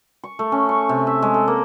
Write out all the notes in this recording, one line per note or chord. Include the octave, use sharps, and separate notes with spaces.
C#6
A3
C#4
C#6
C3
E5
G#3
A4
A#3